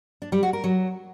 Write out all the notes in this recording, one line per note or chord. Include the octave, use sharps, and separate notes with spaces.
D4
G3
F#4
A#4
F#3